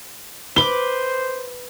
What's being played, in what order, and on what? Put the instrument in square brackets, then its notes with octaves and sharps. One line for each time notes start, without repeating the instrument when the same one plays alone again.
[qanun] B4 D6 [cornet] C5 [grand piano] G7